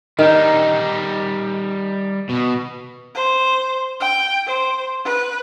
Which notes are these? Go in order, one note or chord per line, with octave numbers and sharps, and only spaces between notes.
D#3 G3 D#4
B2
C5
G5
C5
B4